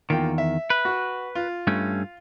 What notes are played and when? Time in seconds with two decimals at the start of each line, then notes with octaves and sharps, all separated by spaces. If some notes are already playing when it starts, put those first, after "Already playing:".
0.10 E2 D#3 A#3 F4 G5
0.38 E5
0.70 B4
0.85 F#4
1.35 F4
1.67 G2 A3 C#4